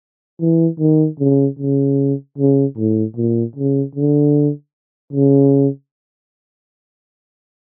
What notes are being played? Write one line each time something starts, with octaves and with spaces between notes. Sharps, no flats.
E3
D#3
C#3
C#3
C#3
A2
A#2
C#3
D3
C#3